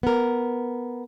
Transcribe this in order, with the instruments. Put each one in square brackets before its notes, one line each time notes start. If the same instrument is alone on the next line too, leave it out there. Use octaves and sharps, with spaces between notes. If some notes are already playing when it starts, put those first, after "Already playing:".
[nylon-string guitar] B3 A#4